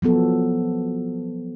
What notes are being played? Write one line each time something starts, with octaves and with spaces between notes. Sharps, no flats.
F3 F#3 B3 A4